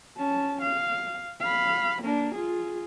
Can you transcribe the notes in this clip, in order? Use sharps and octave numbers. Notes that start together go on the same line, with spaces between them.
C#4 A5
F5
F5 B5
A#3 D4
F4 G#4